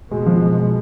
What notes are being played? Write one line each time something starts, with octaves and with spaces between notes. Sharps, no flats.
B2 G#3
F3
G#3
G#3